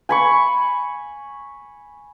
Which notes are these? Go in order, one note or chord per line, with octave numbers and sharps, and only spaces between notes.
G#5 B5 C#6